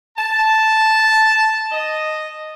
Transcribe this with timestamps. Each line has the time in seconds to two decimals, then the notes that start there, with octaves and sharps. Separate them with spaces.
0.17 A5
1.72 D#5